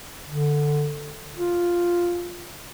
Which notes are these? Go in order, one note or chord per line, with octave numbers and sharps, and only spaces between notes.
D3
F4